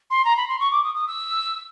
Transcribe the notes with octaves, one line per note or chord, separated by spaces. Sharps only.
C6
A#5
B5
C6
C#6
D6
D#6
D#6
E6